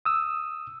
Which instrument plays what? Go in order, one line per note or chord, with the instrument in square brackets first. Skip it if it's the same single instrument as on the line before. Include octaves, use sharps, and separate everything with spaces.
[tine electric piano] D#6 E6